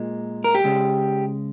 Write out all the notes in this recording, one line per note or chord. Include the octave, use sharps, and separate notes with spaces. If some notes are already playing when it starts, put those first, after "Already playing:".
Already playing: A#2 G#3
A#4
G4
C#3 G#3